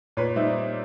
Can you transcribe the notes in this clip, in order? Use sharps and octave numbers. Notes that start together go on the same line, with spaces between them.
A#2 B4 C#5
G3 C4 D#4 D5 E5